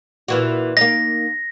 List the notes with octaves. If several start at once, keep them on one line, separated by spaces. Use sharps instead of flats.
A#2 E3 F#4
A#3 D#4 A#6